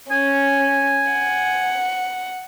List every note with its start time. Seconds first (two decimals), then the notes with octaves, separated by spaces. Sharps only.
0.11 C#4 G#5
1.11 F#5